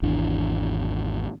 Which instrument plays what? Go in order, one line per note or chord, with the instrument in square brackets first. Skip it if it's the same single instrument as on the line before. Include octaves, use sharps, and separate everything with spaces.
[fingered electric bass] G#1 E2 E3 D4